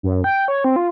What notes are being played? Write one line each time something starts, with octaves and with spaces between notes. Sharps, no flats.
F#2
G5
C#5
C4
F4